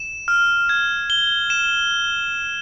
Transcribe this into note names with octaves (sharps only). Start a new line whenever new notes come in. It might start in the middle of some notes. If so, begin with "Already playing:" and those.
Already playing: E7
F6
G#6
G7
E7